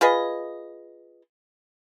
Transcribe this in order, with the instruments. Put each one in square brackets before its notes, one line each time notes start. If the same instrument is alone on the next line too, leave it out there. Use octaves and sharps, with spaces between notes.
[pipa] F4 G#4 B4 D#5